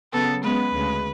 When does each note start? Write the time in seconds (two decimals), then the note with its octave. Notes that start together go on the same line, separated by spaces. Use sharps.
0.12 C#3 F#3 B3 A4
0.43 C#3 G#3 B3 B4
0.74 D2 C#3 G#3